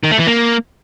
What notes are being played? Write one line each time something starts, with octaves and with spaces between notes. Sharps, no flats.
D#3
A3
E3
A#3